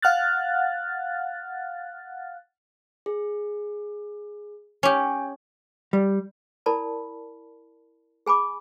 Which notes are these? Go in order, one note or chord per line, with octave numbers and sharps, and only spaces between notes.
F5 F#5 F6 F#6 A6
G#4
C#4 G4 G#5
G3
E4 A#4 D5 A5 B5
G#4 G#5 B5 D6